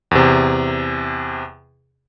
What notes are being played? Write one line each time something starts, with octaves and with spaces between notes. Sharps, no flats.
E2 C3